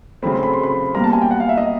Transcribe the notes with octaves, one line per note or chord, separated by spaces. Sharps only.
C#3 F#3 A3 C4 B5
C6
B5
C6
B5
B2 G3 A#3 A#5
A5
G#5
G5
F#5
F5
E5
D#5